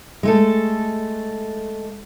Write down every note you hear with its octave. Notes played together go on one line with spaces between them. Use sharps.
G#3 A3 A4